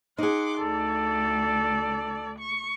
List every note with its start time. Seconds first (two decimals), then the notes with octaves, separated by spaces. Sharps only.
0.18 D#4 G#4 F#5 C6 D6
0.60 D2 A4 D5
2.39 C#6